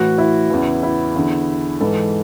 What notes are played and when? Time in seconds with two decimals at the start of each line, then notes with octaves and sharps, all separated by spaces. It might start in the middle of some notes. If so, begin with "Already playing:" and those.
Already playing: A2 E3 F#4
0.18 E4
0.50 E2 C#3 E3
0.83 E4
1.16 E2 D3
1.81 G#2 E3 A4